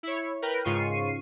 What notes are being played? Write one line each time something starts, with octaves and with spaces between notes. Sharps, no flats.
E4 C#5
A#4 B4 G5
G#2 C#3 F4 C#6 C7 D#7